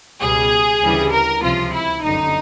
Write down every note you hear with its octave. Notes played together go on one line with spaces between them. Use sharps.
C#2 B2 G3 G#4
D2 C#3 E3 G3
A#4
C#2 C3 F3 F4
E4
G1 F#2 D3 D#4